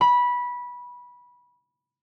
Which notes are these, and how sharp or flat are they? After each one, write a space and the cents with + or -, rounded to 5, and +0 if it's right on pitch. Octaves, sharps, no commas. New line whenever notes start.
B5 -15